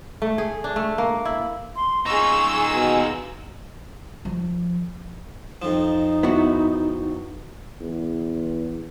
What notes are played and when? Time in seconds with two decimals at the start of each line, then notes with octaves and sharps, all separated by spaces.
0.22 A3
0.38 G#4
0.64 D4
0.76 A3
0.98 A#3
1.25 E4
1.76 C6
2.06 D#4 F4 G#4 C#6 E6
2.73 B2 G#5
4.25 F3
5.62 F2 F3 D#4
6.23 B3 E4 F#4
7.80 E2